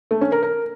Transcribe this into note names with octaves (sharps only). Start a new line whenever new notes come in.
A3
C#4
A#4
A#4